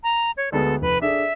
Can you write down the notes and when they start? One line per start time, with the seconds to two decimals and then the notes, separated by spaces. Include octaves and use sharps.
0.03 A#5
0.37 C#5
0.52 D2 G#3 B3 A4
0.82 F1 B4
1.01 D4 G#4 A4 E5